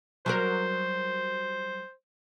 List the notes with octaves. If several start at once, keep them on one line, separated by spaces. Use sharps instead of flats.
F#3 G3 A#4 C5